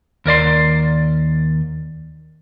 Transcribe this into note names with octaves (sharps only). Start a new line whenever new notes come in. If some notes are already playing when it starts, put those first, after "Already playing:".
D#2 A#4 D5 C6